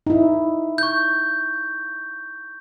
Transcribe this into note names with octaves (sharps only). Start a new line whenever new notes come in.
D#4 E4
C#6 G6